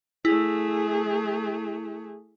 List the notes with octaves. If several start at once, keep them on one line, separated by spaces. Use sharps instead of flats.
A3 E4 G#4